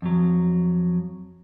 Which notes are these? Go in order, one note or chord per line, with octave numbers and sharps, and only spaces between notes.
F2 F#3